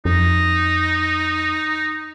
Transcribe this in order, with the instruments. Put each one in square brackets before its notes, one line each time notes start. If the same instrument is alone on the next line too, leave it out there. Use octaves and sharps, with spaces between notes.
[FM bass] F2 [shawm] D#4